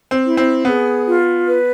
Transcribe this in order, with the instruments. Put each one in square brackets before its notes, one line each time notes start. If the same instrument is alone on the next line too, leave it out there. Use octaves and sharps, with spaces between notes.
[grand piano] C4
[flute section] E4
[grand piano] C4
[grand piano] B3 [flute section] G#4
[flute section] F4
B4